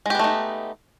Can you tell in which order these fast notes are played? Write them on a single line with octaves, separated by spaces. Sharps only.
G#3 G4 B3 A3 D#4